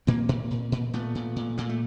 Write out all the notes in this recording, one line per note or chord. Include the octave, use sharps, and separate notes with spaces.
A#2 A#3 C4
A#2
A#2
A#2
A#2 A3 B3
A#2
A#2
A#2 A#3
A3